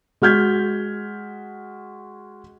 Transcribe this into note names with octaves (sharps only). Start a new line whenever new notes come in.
G#3 F#4 F6 G6 G#6 B6